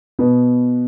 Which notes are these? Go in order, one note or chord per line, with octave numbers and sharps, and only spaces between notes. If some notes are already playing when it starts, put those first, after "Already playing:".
B2 B3